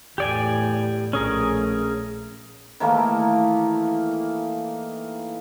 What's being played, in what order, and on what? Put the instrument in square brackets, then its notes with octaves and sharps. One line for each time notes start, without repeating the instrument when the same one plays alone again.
[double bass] E2 A2 [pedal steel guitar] G4 D5 G#5
[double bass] A#1 A3 [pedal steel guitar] C#4 G#4 A#4
[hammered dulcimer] D#3 E3 A3 A#3